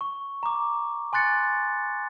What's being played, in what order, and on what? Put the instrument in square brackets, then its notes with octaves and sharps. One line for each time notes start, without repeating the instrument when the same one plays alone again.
[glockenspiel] C#6
A#5 D6
G#5 C6 F#6 A6 C#7